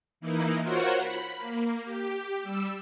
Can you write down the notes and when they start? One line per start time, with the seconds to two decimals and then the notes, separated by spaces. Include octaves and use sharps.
0.21 E3 A#3 D#4 E4
0.61 F4 F#4 A#4 C5 C#5 F#5
0.98 B5
1.37 A#3
1.84 G4
2.43 G3 E6